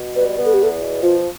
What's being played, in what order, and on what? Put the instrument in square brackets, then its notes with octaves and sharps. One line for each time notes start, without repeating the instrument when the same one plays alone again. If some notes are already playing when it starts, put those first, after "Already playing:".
Already playing: [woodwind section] B2
[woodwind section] G3 [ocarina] B4
[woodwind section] B3
[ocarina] A4
G4
[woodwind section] E2 [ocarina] A4
[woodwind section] B2
[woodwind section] F3 [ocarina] F4